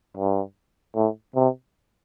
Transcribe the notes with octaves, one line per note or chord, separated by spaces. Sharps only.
G2
A2
C3